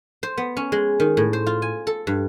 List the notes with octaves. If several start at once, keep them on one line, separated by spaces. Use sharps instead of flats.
C5
B3
C#4
G#3
D#3
A2
C5
F4
G#5
A4
G2